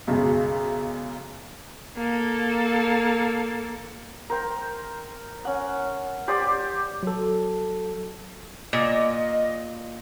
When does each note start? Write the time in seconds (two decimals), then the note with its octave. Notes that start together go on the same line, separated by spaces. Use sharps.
0.07 B1 F#2 C#3 G#3
1.96 A#3 A4
4.30 A#4 C5 G5
5.45 C#4 F#5
6.28 G4 C5 D5 D#6
7.03 F#3 A4
8.73 A#2 D#5